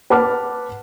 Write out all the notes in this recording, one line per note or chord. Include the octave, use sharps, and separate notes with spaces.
B4 F#5 A5 D6 F6